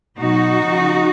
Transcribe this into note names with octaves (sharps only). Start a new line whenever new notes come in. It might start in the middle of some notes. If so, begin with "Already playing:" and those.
B2 F#3 D#4 F#4
C#3 F3